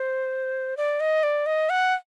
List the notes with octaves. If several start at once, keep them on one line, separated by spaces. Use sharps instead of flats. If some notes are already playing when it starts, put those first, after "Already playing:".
Already playing: C5
D5
D#5
D5
D#5
F#5